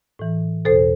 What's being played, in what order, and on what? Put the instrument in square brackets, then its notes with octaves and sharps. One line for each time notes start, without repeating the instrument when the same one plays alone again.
[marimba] A2 E3
E2 B2 A4 C5